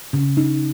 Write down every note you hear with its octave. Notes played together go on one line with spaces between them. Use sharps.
C#3
D#4